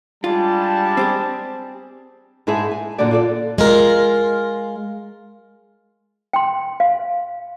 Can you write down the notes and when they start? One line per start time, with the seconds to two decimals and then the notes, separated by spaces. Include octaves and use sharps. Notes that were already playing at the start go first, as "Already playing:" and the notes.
0.24 G3 G#3 D4 F4 A5
0.97 C4 G4 G#4
2.47 G#2 G#3 E4 G#4 E5 A5
2.71 G#5
2.98 F#2 A#2 D3 D4 F#4 D5
3.11 F4 A4 D5
3.58 G#3 F4 A#4
6.33 G5 C6
6.80 F5